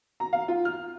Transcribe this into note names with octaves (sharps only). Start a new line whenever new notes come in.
A#5
F5
F4
F6